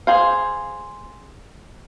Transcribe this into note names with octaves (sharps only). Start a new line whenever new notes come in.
G#4 C5 F5